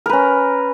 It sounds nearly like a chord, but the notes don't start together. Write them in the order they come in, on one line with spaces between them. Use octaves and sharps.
A#4 B4 C#4